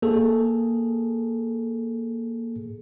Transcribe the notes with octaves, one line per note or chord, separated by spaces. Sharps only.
A#3 G#4 A4